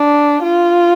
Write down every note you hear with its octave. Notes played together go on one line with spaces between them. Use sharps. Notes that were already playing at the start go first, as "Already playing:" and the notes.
Already playing: D4
F4